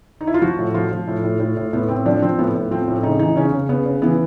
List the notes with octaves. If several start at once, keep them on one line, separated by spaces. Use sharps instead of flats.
D#4
E4
F4
F3 F#4
A2
F3 F4
F3
A2
A2
A2
A2
A2 B3
A2 C4
F3 D4
F3 C4
A2 B3
A2
F3 C4
A2
C#3 D#4
E3 D#4
C#3 C#4
C#3
C#3 B3
C#3
E3 B3